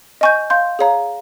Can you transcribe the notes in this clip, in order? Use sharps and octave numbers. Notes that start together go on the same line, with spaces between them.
D#5 G#5 C#6 G6
F5 C6 G6
G#4 C#5 F5 A#5